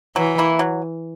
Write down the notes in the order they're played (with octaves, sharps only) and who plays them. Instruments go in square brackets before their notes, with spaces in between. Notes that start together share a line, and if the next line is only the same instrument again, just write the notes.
[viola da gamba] E3 [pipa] F#3
[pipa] A#3 E4
F#3